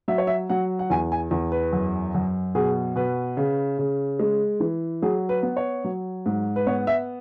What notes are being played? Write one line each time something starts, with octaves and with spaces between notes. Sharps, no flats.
F#3 E5
C#5
E5
F#3 F#5
F#5
E2 G#5
G#5
E2
B4
F#2
F#2
B2 G#4
B2 B4
C#3
C#3
G#3
E3
F#3 G#4
B4
B3
C#5
F#3
G#2
B4
B3 C#5
E5